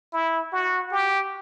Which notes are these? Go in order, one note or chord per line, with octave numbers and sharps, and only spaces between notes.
E4
F#4
G4